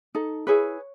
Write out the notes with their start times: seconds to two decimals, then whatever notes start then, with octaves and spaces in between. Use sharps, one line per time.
0.15 D#4 A4
0.47 E4 G#4 B4 C#5